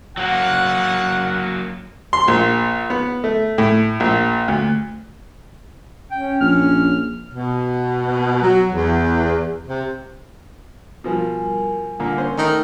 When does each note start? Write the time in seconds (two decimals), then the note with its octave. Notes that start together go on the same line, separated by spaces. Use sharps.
0.18 F#3 A#3 F#5
2.13 C6
2.28 A#1
2.90 B3
3.24 A3
3.58 A2
4.00 A#1
4.48 D2
6.11 C#4 G5
6.41 A#1 F6
7.33 B2
8.42 F#3
8.73 E2
9.67 C3
11.04 B2 F3 G3 A#4 G#5
11.99 A#2 D3 A#3
12.18 C#4 C5
12.38 D#3 A3